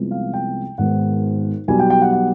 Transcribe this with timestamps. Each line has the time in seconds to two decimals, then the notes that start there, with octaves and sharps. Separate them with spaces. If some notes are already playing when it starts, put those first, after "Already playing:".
Already playing: C2 C3 F3 G#3 B3
0.11 F5
0.34 G5
0.78 G#1 G#2 D#3 G#3 B3 F#5
1.68 B1 B2 G3 G#5
1.79 G5
1.90 G5
2.02 F#5
2.13 F#5